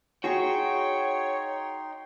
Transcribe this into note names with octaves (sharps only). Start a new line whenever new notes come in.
D#4 F#4 G#4 C#5 G5 C6